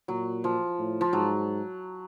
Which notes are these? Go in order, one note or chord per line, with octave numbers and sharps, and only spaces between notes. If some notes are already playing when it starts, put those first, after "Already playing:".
A#2 F#3
F3
A2
F3
G#2 F#3